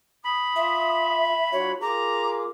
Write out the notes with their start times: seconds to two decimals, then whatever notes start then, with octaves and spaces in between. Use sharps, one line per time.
0.25 B5 D#6
0.56 F4 E5
1.52 F#3 D4 F4 F#4 C#5
1.81 F4 G#4 A#4 A#5 D6